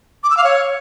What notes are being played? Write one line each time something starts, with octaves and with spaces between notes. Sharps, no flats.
D6
E6
F5
C#5